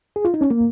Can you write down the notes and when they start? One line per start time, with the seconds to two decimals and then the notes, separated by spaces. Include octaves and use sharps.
0.16 G#4
0.25 F4
0.34 D#4
0.41 C#4
0.51 A#3